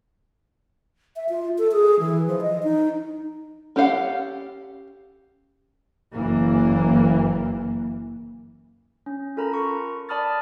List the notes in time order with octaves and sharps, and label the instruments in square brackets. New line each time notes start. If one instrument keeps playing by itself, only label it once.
[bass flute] E5
F4
A4
G#4
E3
F3
D#5
D#4
[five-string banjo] C#4 G4 A4 F5 F#5
[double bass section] F#1 E3 A#3
[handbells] C#4
C#4 F4 A4 A#4 A#5 B5
C#6
D5 A5 B5 D#6 F6 A6